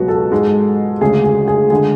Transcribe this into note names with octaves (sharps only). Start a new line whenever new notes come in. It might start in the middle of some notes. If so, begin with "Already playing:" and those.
Already playing: C#2 B2 F#3 F#4 B4
A4
G#2 G#3
D2 C#3 G#3 G#4
G#4
G#4
D3 G#3 G#4